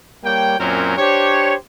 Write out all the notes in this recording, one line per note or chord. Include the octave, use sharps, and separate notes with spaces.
G3 A#3 C#5 G5
F#2 A#2 F#3 C4 C#4 A#4
D4 G4 C5 C#5